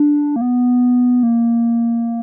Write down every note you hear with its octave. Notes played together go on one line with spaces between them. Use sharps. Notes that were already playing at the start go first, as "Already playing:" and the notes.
Already playing: D4
A#3
B3
A#3